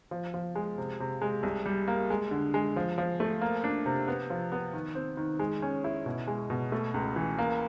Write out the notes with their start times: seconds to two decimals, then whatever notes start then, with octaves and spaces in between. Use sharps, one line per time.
0.11 F3
0.34 F3
0.55 G#3
0.78 C3
1.00 C3
1.21 G#3
1.43 C2
1.66 G3
1.88 A#3
2.10 G#3
2.31 D3
2.54 G#3
2.76 F3
2.98 F3
3.20 A3
3.42 A#3
3.64 D4
3.86 C3
4.08 B3
4.30 F3
4.52 B3
4.73 D#3
4.95 C4
5.17 D#3
5.39 G#3
5.62 C#4
5.84 E4
6.06 B2
6.27 G#3
6.50 B2
6.72 A3
6.94 C#2
7.16 E3
7.39 A#3